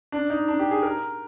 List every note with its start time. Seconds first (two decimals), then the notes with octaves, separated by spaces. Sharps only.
0.12 D4
0.30 D#4
0.48 D4
0.59 G4
0.71 G#4
0.83 A#4